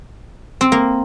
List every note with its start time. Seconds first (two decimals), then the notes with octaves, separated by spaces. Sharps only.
0.61 C4
0.72 A#3